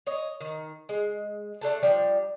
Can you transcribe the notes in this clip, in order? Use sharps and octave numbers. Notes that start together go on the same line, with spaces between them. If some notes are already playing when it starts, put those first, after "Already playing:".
C#5 D#5
D#3
G#3
A3 D4 A4 A5
F3 G3 D4